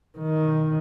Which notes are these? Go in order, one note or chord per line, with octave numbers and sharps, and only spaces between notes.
D#3